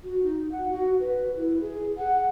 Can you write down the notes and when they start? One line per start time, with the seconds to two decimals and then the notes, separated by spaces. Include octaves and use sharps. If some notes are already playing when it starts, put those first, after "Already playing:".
0.04 F#4
0.23 D#4
0.52 F#5
0.69 F#4
1.00 B4
1.36 E4
1.60 G#4
1.98 F#5